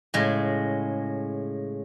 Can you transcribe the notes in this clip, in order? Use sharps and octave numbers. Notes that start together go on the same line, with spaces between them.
A2 C#3 G#3